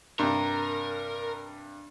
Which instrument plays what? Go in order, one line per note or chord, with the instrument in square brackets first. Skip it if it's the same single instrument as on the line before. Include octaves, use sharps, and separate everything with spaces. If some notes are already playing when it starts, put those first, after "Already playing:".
[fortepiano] G2 C3 [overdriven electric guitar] A#4